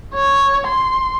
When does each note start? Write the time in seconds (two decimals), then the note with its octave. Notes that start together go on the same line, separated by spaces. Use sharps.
0.14 C#5
0.68 C6